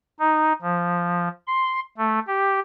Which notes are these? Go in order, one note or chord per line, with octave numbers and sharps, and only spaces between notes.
D#4
F3
C6
A3
G4